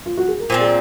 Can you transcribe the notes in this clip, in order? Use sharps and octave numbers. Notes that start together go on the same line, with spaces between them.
F4
F#4
G#4
A#4
A#2 F3 C4 C5
G#4